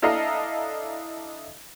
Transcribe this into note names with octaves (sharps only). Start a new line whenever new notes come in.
D4 E4 A4 D#5 F5 A#5